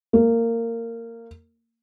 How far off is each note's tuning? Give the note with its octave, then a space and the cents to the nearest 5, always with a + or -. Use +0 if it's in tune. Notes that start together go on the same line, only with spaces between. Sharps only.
A#3 -20